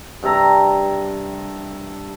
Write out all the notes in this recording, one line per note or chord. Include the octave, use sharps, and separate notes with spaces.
G2 C3 A4 A#5